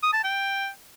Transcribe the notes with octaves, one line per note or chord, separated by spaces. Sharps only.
D#6
A5
G5